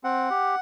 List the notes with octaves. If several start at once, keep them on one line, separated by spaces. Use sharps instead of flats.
C4 F#5
G4